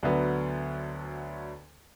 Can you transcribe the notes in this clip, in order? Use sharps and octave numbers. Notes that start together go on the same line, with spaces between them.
D2 D3 F#3 B3